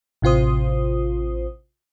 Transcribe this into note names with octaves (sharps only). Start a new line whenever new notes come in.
A1 C3 F4 C5 D#6